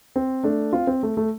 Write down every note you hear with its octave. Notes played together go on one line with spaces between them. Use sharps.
C4
A3 D4
C4 F4
C4
A3
A3